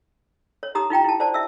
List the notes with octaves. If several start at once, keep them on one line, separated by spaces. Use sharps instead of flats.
C#5
D#4 G4 A#5 D#6
D#4 F4 G5 A#5
E4 A5
C5 D5 A5
E5 E6